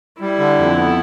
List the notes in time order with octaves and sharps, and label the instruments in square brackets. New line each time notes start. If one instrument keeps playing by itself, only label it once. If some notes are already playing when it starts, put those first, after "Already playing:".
[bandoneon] G3 [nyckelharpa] E4
[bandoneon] D3
F2
B3